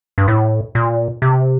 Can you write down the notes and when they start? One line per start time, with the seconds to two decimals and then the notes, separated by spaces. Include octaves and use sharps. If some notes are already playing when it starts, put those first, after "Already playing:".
0.18 G2
0.28 A2
0.75 A#2
1.22 C3